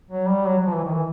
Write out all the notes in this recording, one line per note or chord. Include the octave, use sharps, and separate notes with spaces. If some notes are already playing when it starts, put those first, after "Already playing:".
F#3
G3
F#3
F#3
F3
E3
D#3
E3